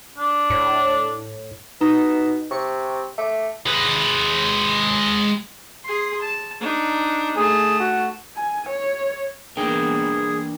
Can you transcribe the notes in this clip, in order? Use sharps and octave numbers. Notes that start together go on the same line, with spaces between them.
D4
A2
B2 D#4 A#5 E7
C3 C#6
A3 D6
G#3 B4
G#4 C6
A5
D4 D#4
A3 G#4 A5
F#4
G#5
C#5
E3 A#3 B3 D4 G#4 A#4 G5